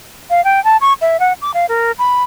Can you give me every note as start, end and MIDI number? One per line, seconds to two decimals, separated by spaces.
0.30 0.44 77
0.44 0.62 79
0.64 0.77 81
0.81 0.93 85
1.01 1.20 76
1.20 1.33 78
1.42 1.51 86
1.54 1.66 77
1.69 1.92 70
1.99 2.23 83